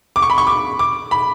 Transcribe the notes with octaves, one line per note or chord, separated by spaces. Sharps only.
D6
C#6
B5
C#6
D6
D6
B5